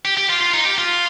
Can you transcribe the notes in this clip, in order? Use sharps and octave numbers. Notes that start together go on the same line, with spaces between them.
G4
G4
F4
F4
D#4
G4
F4